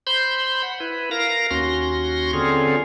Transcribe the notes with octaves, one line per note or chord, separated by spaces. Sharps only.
C5 B5 C6 G6
F#5
E4 B4
A#4 F5 A#6
D#2 C#4 F#4 C6 A#6
D3 C4 C#4 F4 G#4